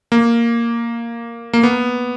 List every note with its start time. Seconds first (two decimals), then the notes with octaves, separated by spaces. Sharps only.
0.12 A#3
1.53 A#3
1.63 B3